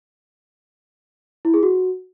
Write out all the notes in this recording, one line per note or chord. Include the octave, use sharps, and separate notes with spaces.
E4
G#4
F#4